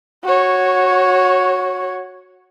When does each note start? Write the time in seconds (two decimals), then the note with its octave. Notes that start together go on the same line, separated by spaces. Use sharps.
0.24 F#4 C#5